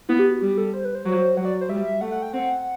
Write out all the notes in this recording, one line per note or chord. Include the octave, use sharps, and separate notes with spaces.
B3 E4
G4
F#4
G3 G4
A4
C5
B4
C5
F#3
F#3 F#5
D5
C5
G3 E5
A3 F#5
F#5
G5
C4 F#5